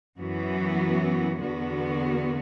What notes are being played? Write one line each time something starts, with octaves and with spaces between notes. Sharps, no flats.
F#2 E3 B3 F#4
E2 D3 B3 F#4